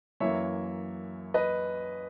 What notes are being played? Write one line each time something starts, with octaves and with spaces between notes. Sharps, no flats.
F#2 E3 A#3 C#5 E5
B4 D#5